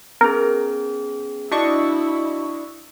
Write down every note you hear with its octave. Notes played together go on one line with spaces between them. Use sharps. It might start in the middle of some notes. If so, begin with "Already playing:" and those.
B3 C#4 G#4 A#4
D4 E4 F#4 D#5 C#6